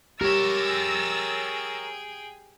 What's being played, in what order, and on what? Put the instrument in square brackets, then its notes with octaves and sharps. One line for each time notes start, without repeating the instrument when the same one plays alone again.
[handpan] G4 [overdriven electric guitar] A#4 C#5 [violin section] E6 A6 A#6
[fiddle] G#4 G5